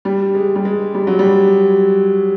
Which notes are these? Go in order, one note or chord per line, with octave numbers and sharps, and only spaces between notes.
G3
G#3
G3
G#3
G3
F#3
G3